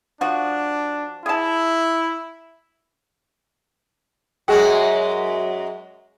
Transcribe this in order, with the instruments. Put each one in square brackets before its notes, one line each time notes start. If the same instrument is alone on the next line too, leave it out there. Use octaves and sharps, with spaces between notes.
[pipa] F3 F#4 [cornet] D4
[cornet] E4 [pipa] G#4 A5
[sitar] F#2 G#3 F#4 [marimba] G#4 G5